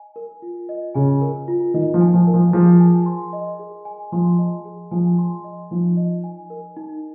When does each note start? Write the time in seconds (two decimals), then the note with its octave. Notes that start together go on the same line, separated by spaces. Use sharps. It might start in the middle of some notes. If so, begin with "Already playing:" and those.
Already playing: D#5 G#5
0.16 A#4
0.42 F4
0.69 D#5
0.94 C#3 G#5
1.21 A#4
1.48 F4
1.74 D#3 D#5
1.94 F3
2.01 G#5
2.14 F3
2.27 A#4
2.34 F3
2.53 F3 G#4
2.80 G#5
3.06 C6
3.33 D#5
3.59 G#4
3.85 G#5
4.12 F3 C6
4.39 D#5
4.65 G#4
4.91 F3 G#5
5.18 C6
5.44 D#5
5.71 F3 D#4
5.97 D#5
6.24 G#5
6.50 A#4
6.76 D#4